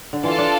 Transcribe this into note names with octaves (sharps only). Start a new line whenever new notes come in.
D3
E3 F4 A4 D5 F5 A5
D4